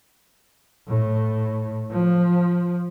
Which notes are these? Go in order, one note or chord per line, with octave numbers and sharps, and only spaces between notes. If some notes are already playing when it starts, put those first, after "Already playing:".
A2
F3